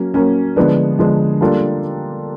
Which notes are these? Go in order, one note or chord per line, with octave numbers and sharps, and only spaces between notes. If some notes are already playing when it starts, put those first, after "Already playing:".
Already playing: F#3 A#3 C#4
F#3 A#3 C#4
D3 F3 G#3 B3 D4
D3 F3 G#3 B3 D4
G3 A#3 D4 F4 A4